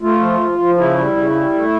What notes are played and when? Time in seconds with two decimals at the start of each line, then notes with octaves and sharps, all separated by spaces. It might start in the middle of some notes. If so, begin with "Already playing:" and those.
0.02 A3 F4
0.20 F3
0.40 F3
0.58 F3
0.78 C#3 E4
0.98 G3
1.17 C#3
1.35 G3
1.54 A3